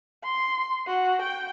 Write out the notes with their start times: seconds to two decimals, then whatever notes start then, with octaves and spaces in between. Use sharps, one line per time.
0.23 C6
0.87 F#4
1.22 G5